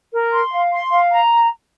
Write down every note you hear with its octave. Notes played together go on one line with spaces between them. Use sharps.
A#4
C6
F5
C6
F5
A#5